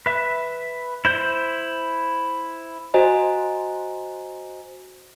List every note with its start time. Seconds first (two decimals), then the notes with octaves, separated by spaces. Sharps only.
0.06 B4 E5
1.05 E4 C5 G6
2.94 F#4 C5 D#5 G#5 A#5